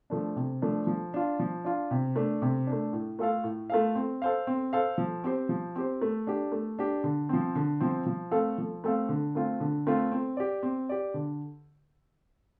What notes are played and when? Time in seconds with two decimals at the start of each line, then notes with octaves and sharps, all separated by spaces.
0.10 F3 A3 D4
0.36 C3
0.62 F3 A3 D4
0.87 F3
1.14 D4 F4
1.40 F3
1.64 D4 F4
1.91 C3
2.16 A3 D4
2.42 C3
2.67 A3 D4
2.93 A2
3.19 A3 F4 A4 F5
3.44 A2
3.70 A3 F4 A4 F5
3.95 C4
4.22 A4 C5 F5
4.47 C4
4.73 A4 C5 F5
4.98 F3
5.24 C4 G4 C5
5.49 F3
5.76 C4 G4 C5
6.02 A3
6.27 D4 G4
6.52 A3
6.79 D4 G4
7.04 D3
7.29 F3 C4
7.55 D3
7.80 F3 C4
8.06 F3
8.31 A3 C4 A4 F5
8.58 F3
8.84 A3 C4 A4 F5
9.09 D3
9.35 A3 C4 F4
9.60 D3
9.87 A3 C4 F4
10.12 C4
10.37 G4 D5
10.63 C4
10.89 G4 D5
11.14 D3